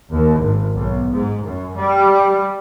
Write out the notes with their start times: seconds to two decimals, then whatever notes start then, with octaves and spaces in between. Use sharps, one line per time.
0.10 D#2
0.40 G#1
0.74 B1
1.11 G#2
1.44 F#2
1.77 G3